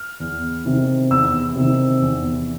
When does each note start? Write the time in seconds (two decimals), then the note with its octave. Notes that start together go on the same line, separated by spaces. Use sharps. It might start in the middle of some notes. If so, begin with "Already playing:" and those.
Already playing: F6
0.20 E2
0.65 C3 D#3
1.11 E2 E6
1.56 C3 D#3
2.02 E2